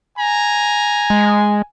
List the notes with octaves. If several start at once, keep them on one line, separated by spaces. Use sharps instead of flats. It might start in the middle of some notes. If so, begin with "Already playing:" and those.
G#5 A#5
G#3